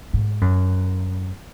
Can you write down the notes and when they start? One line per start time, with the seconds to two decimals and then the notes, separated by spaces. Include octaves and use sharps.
0.13 G#2
0.41 F#2